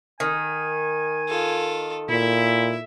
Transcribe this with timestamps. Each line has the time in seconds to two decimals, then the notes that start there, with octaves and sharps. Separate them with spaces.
0.20 D#3 G#5
1.28 F4 A4
2.09 A#2 E4 E5